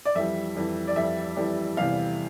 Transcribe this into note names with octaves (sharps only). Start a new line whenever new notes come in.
D5
F2 E3 G3 E5
F2 E3 G3
D5
F2 E3 G3 E5
F2 E3 G3
E2 C3 E3 G3 F5